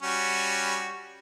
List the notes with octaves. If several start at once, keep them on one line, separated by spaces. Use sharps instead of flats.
G3 C#4 F#4